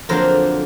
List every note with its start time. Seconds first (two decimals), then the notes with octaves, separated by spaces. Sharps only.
0.09 F2 D3 F#3 A#3 D4 A#4 C5